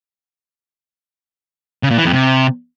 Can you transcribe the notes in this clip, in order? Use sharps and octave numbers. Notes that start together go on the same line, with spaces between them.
C#3
A#2
E3
F2
C3